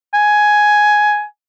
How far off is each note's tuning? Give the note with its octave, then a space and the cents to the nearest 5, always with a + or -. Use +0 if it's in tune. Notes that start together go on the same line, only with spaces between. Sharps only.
G#5 +10